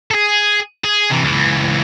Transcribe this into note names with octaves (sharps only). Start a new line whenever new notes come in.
G#4 A4
G#4
C3 E3
C#2 E3